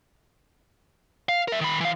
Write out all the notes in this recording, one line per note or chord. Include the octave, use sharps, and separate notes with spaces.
F5
A#4 E5
D#3 B5
E3 F5